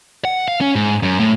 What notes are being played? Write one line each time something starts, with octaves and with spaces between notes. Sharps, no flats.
F#5
F5
C#4
G#2
F#2
A2